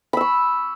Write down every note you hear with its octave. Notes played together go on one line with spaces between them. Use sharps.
B5 C#6 E6